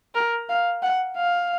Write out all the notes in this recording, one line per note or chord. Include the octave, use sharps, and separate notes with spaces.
A#4
F5
F#5
F5